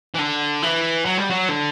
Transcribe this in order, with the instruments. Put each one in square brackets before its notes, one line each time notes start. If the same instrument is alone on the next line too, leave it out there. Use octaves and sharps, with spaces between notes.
[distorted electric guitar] E3
D3
E3
F#3
G3
F#3
D3